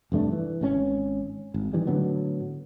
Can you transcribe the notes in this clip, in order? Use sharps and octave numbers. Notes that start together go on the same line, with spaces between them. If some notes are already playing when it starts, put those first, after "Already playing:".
F1 G2 A3 D4
E3
G#1 C3 C#4
G#1
D#3 E3 G3
A2 D3 F#3 B3